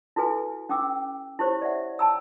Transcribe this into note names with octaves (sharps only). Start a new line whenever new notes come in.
E4 F#4 A4 B4 G#5
C#4 G5 D6 E6
E4 G4 C5 C#5
D5 E5 F#5
G5 A5 A#5 E6